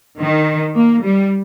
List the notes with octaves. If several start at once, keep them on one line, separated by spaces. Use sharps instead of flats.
D#3
A#3
G3